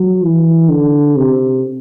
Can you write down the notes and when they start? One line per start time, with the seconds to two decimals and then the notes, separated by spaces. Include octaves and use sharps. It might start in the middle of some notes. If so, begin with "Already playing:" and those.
Already playing: F#3
0.24 E3
0.69 D3
1.16 C3